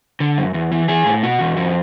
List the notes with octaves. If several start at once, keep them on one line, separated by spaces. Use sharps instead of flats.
D3
F#2
E2
E3
E3 G#4
A2
B2 F#4
E2
F2